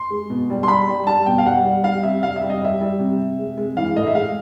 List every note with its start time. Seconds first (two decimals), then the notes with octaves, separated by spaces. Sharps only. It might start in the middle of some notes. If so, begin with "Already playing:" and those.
Already playing: C6
0.10 G#3
0.30 B2
0.50 G3
0.63 C6
0.68 G3 B5
0.88 G3
1.07 G3 A5
1.26 B2 G5
1.38 F5
1.45 G3 F#5
1.65 G3
1.84 G3 F5
2.03 C3 E5
2.22 G3 F5
2.36 E5
2.42 G3
2.50 D#5
2.62 G3 E5
2.81 G3
2.99 C3
3.19 C3
3.39 G#3
3.57 G#3
3.77 E3 F5
3.96 A2 D#5
4.07 E5
4.15 G#3 F5